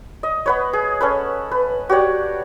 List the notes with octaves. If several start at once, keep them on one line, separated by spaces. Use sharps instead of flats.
D#5
B3 B4 C#5
G#4
C#4 A4 B4
B4
F#4 G4 C#5 D5